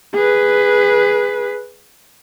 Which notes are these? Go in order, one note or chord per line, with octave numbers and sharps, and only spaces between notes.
G#4 B4